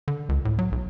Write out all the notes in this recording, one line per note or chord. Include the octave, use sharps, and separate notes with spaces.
D3
C#2
A2
F#3
B1